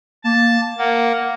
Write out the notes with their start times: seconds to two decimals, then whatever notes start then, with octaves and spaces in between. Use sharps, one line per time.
0.24 A#3 A5
0.78 A#3 F#5